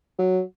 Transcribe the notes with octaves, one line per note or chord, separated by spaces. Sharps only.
F#3